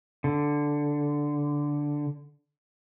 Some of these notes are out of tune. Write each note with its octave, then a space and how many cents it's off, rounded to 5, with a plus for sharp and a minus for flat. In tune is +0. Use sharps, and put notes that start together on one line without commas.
D3 -5